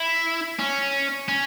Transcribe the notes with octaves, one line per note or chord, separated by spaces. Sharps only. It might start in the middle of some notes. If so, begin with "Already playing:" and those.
Already playing: E4
C#4
C#4